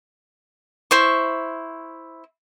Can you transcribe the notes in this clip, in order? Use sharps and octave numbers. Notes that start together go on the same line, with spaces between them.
E4 C5 C#6